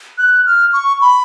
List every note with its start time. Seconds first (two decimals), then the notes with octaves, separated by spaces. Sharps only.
0.18 F#6
0.46 F6
0.73 C#6
1.01 B5